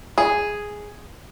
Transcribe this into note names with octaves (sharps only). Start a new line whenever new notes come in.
G#4